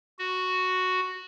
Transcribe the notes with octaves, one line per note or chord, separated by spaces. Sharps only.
F#4